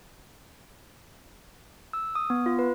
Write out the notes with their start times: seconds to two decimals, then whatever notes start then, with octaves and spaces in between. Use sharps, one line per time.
1.93 E6
2.15 D#6
2.30 B3
2.46 F4
2.59 B4